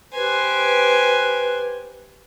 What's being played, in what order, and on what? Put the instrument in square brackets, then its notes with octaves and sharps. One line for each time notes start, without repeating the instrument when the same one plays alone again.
[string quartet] G4 C5 G#5 [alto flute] B4